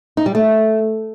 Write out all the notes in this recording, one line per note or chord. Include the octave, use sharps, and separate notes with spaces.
D#4
G3
A3